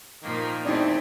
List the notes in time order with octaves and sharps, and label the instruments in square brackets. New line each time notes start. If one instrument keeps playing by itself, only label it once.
[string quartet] A#2 F3 A#3 [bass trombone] D#3
[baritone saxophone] E2 [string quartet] A3 C4 [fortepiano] D4 D#4